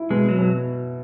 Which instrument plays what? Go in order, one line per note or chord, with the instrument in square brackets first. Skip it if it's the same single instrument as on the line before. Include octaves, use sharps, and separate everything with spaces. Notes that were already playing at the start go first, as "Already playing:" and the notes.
Already playing: [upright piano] E4
[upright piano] B2 [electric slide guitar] G#3
[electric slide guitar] F#3
[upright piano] B2